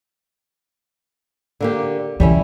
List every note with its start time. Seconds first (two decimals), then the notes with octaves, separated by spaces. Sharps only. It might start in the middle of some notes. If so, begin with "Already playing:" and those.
1.60 D3 A#3 G4
2.20 D3 E3 G3 C#4 E4